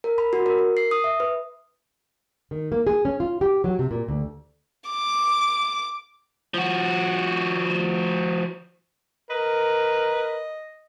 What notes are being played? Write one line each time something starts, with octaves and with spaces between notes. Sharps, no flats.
A#4
B5
F#4
A#4
A#4
C7
D#6
E5
B4
D#3
A#3
G#4
C#4
F4
G4
F#3
C3
A#2
D2
D6
F3 F#4
A#4 B4 D#5